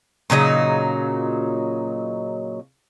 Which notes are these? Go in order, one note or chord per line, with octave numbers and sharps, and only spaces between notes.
A#2 C#3 F#3 D#4